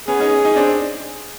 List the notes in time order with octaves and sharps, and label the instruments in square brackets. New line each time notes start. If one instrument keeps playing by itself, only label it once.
[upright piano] B3 C#4 [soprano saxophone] G#4
[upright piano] C#4 D#4
C#4 D#4
C4 D4